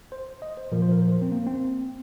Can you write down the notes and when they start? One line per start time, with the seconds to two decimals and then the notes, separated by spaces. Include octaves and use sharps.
0.12 C5
0.42 D#5
0.57 C5
0.72 A#2 F3 A#4
0.82 C5
0.92 A#4
1.02 C5
1.12 C5
1.22 C4
1.32 A#3
1.47 C4